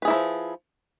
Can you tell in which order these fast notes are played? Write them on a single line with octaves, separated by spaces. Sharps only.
B4 G#4 E4 A#3 F3